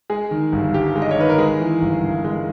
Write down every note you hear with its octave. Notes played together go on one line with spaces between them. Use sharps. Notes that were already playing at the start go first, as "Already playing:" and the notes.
G#3 G#4
D#3
G1
G2 G4
G#3
D#5
C#5
D#3 B4
A#4
G#3 G#4
E3
G1
G2
G#3